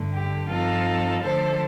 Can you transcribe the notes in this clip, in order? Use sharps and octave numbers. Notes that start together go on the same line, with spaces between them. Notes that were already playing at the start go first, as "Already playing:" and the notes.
Already playing: G2 D3 A3
G4
G2 F3 C4 D#4 F4 A4
D3 F3 A3 D4 A4 C5